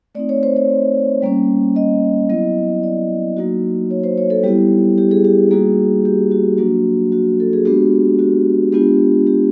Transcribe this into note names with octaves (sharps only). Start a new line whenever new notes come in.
A3 C4 D#4 D5
C#5
C5
C#5
G3 A#3 C#4
D#5
F#3 B3 E4 D#5
D5
F#3 A#3 D#4 F#4
C#5
C5
C#5
A4
G3 B3 E4 G4
G4
G#4
G4
G3 A#3 D#4 F#4 G#4
G4
F#4
F#3 A#3 D4 F#4
F#4
A4
G#4
G#3 B3 D4 F#4 G4
F#4
G#3 B3 D4 F4 G4
G4